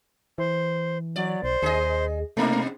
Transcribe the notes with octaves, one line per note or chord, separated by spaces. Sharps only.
E3 C5
F#3 D5
B1 C5
D#2 G#4 D#5
B2 A3 A#3 D#4